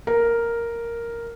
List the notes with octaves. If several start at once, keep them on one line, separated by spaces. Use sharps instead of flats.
A#4